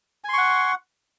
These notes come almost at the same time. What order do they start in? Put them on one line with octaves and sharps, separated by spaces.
G#5 C6 C#6 F#5